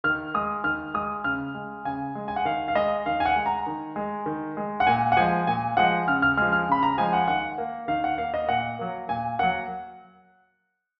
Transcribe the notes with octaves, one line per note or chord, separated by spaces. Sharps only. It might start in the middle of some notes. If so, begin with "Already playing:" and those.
D#3 F6
G#3 D#6
D#3 F6
G#3 D#6
C#3 F6
G#3
C#3 G#5
G#3
G#5
F#5
D#3 F5
F5
G#3 D#5
D#3 F5
G#5
F#5
G#3
A#5
D#3
G#3
D#3
G#3
F#5
A#2 G#5
F#5
F3 G#3 G#5
A#2 G#5
F3 G#3 F#5
C#3 F6
F6
F3 G#3 F6
F6
C#3 B5
A#5
F3 G#3 G#5
F#5
D#3 F#5
A#3
D#3 F5
F#5
A#3 F5
D#5
A#2 F#5
F#3 A#3
A#2 G#5
F#3 A#3 F#5